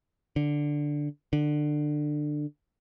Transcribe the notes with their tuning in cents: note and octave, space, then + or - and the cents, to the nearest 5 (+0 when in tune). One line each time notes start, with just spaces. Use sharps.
D3 +0
D3 +20